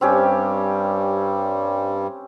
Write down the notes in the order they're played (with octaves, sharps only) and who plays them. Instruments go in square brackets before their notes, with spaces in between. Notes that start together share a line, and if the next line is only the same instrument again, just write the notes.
[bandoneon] G2 G3 [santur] C4 C#4 G4